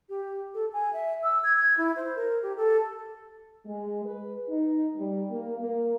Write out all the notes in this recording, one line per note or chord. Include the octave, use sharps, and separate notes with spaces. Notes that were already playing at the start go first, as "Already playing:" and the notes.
G4
A4
G#5
E5
E6
G#6
G#6
E4
C5
A#4
G4
A4
G#3
B4
D#4
G3
A#3
A#3